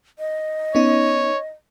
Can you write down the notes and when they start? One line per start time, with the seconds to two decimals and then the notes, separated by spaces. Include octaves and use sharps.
0.19 D#5
0.75 B3 C#4 D#4 C#5